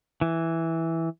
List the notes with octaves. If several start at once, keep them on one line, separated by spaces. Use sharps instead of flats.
E3